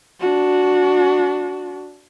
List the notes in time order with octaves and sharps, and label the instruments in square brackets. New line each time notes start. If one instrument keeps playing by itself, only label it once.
[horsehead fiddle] D4 F#4